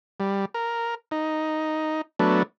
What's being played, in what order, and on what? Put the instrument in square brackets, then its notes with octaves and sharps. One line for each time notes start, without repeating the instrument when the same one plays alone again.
[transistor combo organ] G3
A#4
D#4
F#3 A3 B3 D4